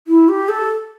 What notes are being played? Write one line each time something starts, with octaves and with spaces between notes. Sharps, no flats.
E4
G4
A4